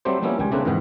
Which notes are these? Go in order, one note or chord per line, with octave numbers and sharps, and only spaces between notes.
F#3 G3 A3 C4 G4 C5
F3 G3 A#3 B3 C#4 E4
C#2 G3 G5 G#5
C#3 A3 A#3 C4 D4 B4
F2 G#2 E3 B3 G5